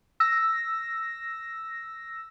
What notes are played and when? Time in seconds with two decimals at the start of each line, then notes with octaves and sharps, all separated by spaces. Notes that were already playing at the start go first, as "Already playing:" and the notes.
0.20 E6 A#6